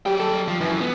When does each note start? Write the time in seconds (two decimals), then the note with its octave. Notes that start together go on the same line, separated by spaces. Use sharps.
0.06 F#3 G3 G5
0.20 A4
0.48 F3
0.61 F#2 E3
0.80 B3